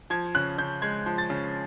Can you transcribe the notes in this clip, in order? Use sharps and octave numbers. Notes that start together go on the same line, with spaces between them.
F3 G#6
C#3 F#6
C#3 G6
G#3 G#6
F3
A6
C#3